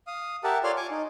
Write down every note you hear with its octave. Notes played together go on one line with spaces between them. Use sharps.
F5 D#6
G4 A#4 E5 F#5 A5
F4 A4 C#5 D5 C6 F6
G#5 C#6 D6
D#4